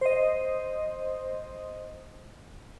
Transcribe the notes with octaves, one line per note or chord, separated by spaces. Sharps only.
C5 D#5